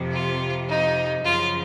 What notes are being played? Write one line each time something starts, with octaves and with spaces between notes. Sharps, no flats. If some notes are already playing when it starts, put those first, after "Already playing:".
Already playing: F2 C3 F3
F4
D#4
F#2 C#3 F3 F4